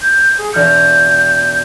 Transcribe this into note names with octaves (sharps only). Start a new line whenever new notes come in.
G6
G#4
E1 F6 G6 C#7